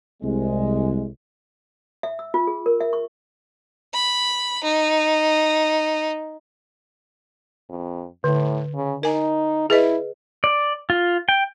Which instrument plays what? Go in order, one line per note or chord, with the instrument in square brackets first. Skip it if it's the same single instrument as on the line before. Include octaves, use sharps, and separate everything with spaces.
[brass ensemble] C2 G#3
[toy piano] E5
E6
F4
G#4
A#4
E5
C#6
[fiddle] B5
D#4
[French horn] F2
[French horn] A2 [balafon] D3
[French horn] C#3
[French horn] D#4 [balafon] A#4 G#5
[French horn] E4 [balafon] G#4 B4 D#5
[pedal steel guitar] D5
F4
G5